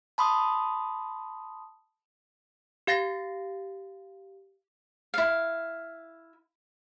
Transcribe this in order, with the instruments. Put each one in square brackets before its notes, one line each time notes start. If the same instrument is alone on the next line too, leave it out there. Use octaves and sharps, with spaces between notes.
[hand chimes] A5 B5 C6 D#6
[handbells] G4 F5 A6 A#6 C7
[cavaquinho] E4 F5